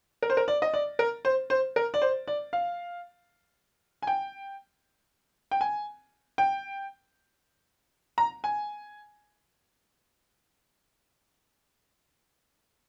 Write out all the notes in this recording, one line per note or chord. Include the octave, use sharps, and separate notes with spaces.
A#4
C5
A#4
D5
D#5
D5
A#4
C5
C5
A#4
D5
C5
D5
F5
G#5
G5
G5
G#5
G5
A#5
G#5